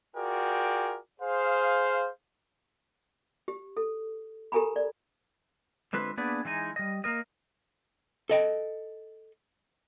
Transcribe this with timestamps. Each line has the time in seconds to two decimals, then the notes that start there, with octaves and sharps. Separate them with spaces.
0.16 F4 F#4 G#4 A#4 D5 G5
1.21 G#4 C5 F5
3.48 G4
3.77 A4
4.52 G4 A4 A#4 G#5 A#5 B5
4.76 D5
5.93 D3 G#3 C4 F4 B4
6.17 A#3 B3 D4 G#4 B4 D5
6.45 E3 G#3 D#4 G#5
6.76 G3 D#5
7.04 A#3 A#4 D#5
8.29 A4 D#5 G5